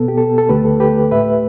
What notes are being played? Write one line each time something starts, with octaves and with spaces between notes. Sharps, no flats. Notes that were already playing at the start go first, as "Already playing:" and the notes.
Already playing: B2 B3 A4
G4
A4
A4
D2 D3 A3 G4 B4
A4
G4 B4
A2 A3 B4 E5